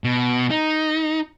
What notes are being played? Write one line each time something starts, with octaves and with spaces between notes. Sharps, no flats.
B2
D#4